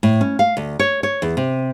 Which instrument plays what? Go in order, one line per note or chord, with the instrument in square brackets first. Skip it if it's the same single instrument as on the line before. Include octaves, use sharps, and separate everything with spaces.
[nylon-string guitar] A2
C#4
F5
D2
C#5
C#5
E2
C3